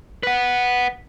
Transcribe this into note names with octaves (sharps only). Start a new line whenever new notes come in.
B4 F#5